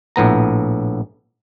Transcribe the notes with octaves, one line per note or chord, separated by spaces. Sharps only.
A#1 A2 B3 A#5